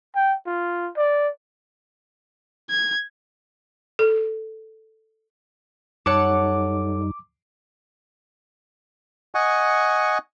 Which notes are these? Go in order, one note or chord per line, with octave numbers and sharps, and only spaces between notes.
G5
F4
D5
G#6
A4
F#2 G3 D#4 A4 C#5 F#5 D6
D#5 F#5 G#5 C#6